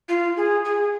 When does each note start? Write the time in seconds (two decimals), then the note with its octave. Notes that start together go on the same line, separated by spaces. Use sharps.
0.09 F4
0.37 G#4
0.65 G#4